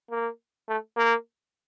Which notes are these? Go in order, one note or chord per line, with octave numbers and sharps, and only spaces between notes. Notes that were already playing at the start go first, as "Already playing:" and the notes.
A#3
A3
A#3